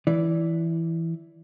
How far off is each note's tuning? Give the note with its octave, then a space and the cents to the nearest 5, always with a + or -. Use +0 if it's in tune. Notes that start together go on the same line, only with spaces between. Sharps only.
E3 +0 D5 -15